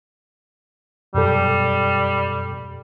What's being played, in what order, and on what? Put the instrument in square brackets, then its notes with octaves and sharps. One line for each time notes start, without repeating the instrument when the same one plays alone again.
[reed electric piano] F#2 B2 A4 [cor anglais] G3